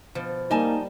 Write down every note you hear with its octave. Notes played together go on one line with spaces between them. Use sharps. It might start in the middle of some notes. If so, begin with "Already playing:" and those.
B2 F3
G3 A#3 D#4 D#5 G#5 A5